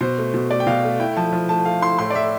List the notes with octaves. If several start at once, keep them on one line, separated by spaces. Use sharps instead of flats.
B2 C5
A3
B2
A3 D5
G5
B2 F5
A3
E4 G5
F3 A5
F3
A3 A5
A3 F5
E4 C6
A2 C6
D5
A2 E5